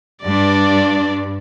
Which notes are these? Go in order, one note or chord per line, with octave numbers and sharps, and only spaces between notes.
G2 D4 D5